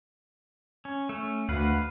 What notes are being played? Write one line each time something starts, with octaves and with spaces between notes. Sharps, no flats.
C#4
A3 C#4
D2 B4 F5 F#5